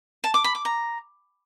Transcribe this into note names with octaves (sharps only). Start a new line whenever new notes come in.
A5
D6
B5
D6
A#5